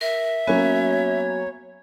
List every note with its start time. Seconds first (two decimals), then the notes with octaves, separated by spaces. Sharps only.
0.01 A#4 E5
0.47 F#3 A#3 B3 C#4 F#4 C#5 G#5